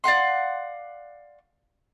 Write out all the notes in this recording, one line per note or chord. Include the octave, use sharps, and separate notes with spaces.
D5 F5 F#5 C6